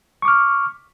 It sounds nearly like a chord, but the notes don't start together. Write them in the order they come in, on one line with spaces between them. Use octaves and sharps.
C#6 D6 F6